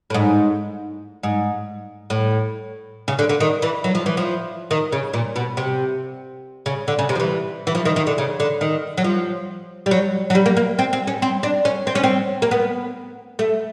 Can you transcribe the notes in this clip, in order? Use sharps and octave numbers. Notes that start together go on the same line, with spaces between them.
A2
G#2
G#2
A2
C#3
D3
D3
D#3
E3
F#3
F3
E3
F3
D#3
C#3
A#2
B2
C3
C#3
D3
C#3
C3
F3
E3
E3
F3
D#3
D#3
D3
C#3
D3
D#3
F#3
F3
G3
F#3
F#3
G3
A#3
A#3
C4
C4
C#4
C4
D4
C#4
C4
C#4
C4
A#3
B3
A3